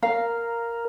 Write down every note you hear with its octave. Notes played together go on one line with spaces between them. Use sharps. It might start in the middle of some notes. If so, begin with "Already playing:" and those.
A#4 F5